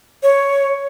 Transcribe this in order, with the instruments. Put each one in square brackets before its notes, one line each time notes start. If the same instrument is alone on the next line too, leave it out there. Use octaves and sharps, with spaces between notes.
[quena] C#5